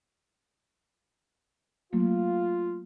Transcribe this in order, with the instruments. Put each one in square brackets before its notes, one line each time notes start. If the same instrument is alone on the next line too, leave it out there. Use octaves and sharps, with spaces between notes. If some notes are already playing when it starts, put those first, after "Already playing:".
[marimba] F#3 A3 A#3 [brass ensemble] F4